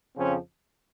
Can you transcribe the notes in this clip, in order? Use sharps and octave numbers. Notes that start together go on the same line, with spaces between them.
F2 C#3 F3 C4 C#4